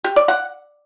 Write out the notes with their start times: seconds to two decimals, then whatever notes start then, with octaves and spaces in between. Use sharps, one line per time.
0.04 G4
0.16 D5
0.28 F#5